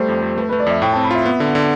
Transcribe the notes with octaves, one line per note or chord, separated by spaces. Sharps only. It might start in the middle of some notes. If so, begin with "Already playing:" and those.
Already playing: G3 A3 C5
F2
F2
A3 B4
A3 B4
D5
F2 E5
A2 G5
C4 A5
B5
F4 E5
B3
D3
D3